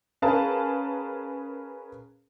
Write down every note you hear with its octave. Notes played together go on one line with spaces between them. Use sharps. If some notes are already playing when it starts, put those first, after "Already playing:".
C#4 G#4 A#4 B4 F5 A5